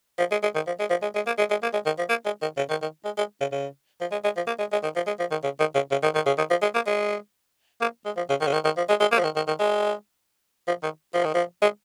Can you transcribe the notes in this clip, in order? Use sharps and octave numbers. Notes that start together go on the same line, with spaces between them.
F3
G#3
G#3
D#3
F3
G#3
F3
G#3
G#3
A#3
G#3
G#3
A#3
G#3
D#3
F3
A#3
G#3
D#3
C#3
D#3
D#3
G#3
G#3
C#3
C#3
F3
G#3
G#3
F3
A#3
G#3
G#3
D#3
F3
G#3
F3
D#3
C#3
D#3
C#3
C#3
D#3
D#3
C#3
D#3
F3
G#3
A#3
G#3
A#3
G#3
F3
C#3
D#3
C#3
D#3
D#3
F3
G#3
G#3
A#3
F3
D#3
D#3
D#3
G#3
F3
D#3
F3
D#3
F3
G#3